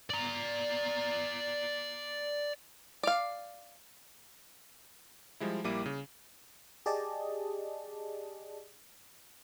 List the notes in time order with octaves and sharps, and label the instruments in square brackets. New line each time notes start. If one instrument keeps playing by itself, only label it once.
[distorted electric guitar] D5 A#5
[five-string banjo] D5 F5
[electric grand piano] F3 G3 G#3 E4
A#1 G3 A#3 E4 D6 D#7
C#3
[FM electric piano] G4 G#4 D5 D#5 A5